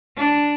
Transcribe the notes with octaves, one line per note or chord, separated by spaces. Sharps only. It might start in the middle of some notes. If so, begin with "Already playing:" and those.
D4